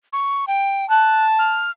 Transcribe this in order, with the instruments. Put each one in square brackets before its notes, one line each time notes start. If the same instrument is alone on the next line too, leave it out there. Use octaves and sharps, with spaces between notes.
[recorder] C#6
G5
[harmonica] A5 [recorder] F#6
[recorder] F6